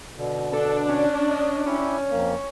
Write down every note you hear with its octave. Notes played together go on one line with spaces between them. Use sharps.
B2 D3
D4 A4
C#4
D#5
C#4 E4 G4
F2 A#3